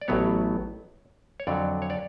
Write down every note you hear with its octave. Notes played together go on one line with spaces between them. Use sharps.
D5
A1 A2 F#3 B3 C#5
C#5
F2 D3 F#3 D5
C#5
D5